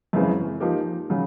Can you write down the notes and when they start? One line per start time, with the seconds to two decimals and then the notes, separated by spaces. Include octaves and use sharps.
0.13 F#2 C#3 E3 G#3 C4
0.60 F3 A#3 D#4 G4
1.10 C#3 F#3